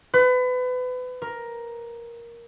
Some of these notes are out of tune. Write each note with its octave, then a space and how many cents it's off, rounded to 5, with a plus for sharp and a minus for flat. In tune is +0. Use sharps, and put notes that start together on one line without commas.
B4 +30
A#4 +10